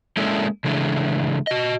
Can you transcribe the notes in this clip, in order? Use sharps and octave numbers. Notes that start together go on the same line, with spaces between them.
G#3 A#3 C#4 D4 E4 A4
C#3 E3 G#3 A3 D4
F#4 D#5